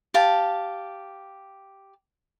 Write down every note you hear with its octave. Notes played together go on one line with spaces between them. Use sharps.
G4 F5 A5